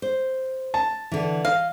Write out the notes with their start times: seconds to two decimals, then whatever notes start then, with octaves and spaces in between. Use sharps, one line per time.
0.02 C5
0.74 A5
1.11 D3 E3
1.45 D#5 F5